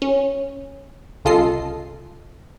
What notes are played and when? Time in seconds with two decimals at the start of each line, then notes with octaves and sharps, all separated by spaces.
0.02 C#4
1.25 C2 C#3 F4 A4 D#5 C7